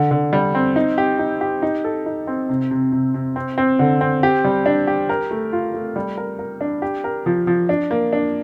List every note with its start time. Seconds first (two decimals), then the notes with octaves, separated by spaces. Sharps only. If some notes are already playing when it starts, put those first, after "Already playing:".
Already playing: D3
0.11 D3
0.33 G3
0.55 C4
0.76 D#4
0.98 G4
1.19 D#4
1.41 G4
1.62 D#4
1.84 A4
2.06 D#4
2.27 C4
2.49 C3
2.71 C3
2.92 C3
3.14 C3
3.36 C4
3.58 C4
3.79 D3
4.01 C4
4.23 G4
4.45 G3
4.66 D4
4.87 G4
5.09 A#4
5.31 A3
5.52 F4
5.74 A3
5.96 G3
6.17 A#4
6.39 A#4
6.61 D4
6.82 G4
7.04 A#4
7.26 F3
7.47 F3
7.69 D4
7.91 A#3
8.13 D4